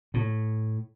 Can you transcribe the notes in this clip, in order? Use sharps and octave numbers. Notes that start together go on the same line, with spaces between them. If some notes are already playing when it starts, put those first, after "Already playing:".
A2